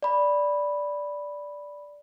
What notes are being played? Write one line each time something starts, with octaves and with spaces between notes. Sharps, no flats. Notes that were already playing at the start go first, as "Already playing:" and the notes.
D5 B5